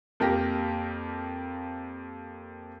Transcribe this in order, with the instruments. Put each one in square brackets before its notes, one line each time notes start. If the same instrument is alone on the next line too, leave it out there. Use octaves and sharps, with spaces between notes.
[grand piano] F2 A#3 G4 A#6